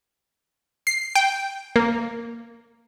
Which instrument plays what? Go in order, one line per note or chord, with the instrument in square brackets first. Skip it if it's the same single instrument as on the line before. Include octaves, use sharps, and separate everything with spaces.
[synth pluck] C7
G5
A#3